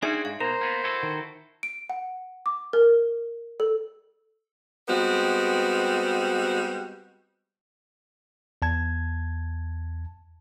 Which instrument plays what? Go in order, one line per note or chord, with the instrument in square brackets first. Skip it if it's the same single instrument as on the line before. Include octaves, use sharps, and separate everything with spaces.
[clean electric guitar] C4 F#4 [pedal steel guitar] D4 G#4 [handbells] D#4 E5
[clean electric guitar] G#2 [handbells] F5
[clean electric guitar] B2 A#3 [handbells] A#4 [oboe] C5 [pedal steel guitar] A#5
[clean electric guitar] A#3 B3
E4 F#4 A4
[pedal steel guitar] D#3
[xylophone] D7
F#5
D6
A#4
A4
[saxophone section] G3 G#3 B3 C4 F#4
[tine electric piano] E2 A5 G#6